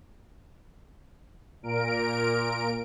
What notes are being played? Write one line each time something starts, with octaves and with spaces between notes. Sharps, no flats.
A#2 A#4 D7